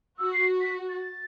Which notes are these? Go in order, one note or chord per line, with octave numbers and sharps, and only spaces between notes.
F#4 E6
C7
B6
A6